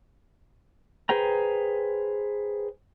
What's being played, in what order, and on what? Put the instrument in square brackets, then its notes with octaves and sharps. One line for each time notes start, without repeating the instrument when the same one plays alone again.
[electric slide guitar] G#4 B4 C5 G5 A#5